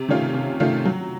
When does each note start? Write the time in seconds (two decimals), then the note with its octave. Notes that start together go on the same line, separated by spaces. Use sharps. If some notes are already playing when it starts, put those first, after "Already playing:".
Already playing: C3
0.09 D#3 A3 C#4 F4
0.34 C3
0.60 D#3 A3 C#4 F4
0.85 F#3